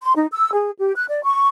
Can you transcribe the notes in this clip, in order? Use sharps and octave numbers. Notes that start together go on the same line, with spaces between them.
C6
D#4
E6
G#4
G4
F#6
D5
C#6